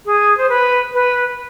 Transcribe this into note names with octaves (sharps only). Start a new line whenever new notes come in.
G#4
C5
B4
B4